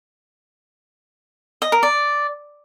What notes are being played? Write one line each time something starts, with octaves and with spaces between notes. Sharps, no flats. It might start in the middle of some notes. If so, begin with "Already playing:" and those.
D#5
A#4
D5